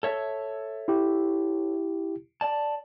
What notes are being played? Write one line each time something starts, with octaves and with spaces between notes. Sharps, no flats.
A4 C#5 E5
E4 G4
D5 A5